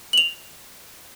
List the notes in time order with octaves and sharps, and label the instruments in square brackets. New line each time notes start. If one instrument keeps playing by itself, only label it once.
[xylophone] F7 F#7